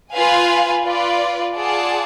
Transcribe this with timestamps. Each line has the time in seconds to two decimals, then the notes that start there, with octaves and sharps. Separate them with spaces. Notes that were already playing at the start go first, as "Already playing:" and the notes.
0.12 F4 B4 F5 G#5
0.84 F4 B4 D5
1.56 F4 G#4 D5 F#5 A5